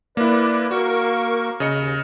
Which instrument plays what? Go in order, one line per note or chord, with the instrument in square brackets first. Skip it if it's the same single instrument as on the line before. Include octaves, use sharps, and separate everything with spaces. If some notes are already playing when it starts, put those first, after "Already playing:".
[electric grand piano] A#3 E4 [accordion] B4 D5
[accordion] A#3 A#4 C#6 [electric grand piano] F#4
[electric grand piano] C#3 D#5 C#7
[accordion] D#2